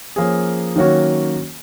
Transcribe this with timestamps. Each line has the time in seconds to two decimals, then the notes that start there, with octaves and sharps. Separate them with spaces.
0.16 F3 A#3 C#4 G#4
0.76 D#3 F#3 A#3 C#4 F#4